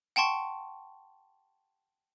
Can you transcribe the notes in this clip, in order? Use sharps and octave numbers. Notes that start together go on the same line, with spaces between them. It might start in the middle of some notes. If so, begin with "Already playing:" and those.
F#5 G5 A5 C6 C#6